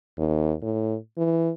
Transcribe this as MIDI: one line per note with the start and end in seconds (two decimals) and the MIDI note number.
0.18 0.53 39
0.62 0.96 45
1.18 1.51 52